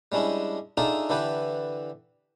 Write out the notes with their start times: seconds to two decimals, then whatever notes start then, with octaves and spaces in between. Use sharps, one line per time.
0.12 G3 G#3 C#4 D4 E4
0.77 D4 D#4 F4 G#4 A4 E5
1.09 D3 E3 E4 G4 A4 B4